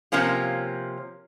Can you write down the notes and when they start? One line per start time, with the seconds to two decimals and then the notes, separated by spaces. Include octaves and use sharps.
0.12 C3 F3 A#3 C#4 F4